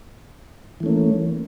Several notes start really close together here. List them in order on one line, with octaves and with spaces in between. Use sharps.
E3 A3 C#4 A#3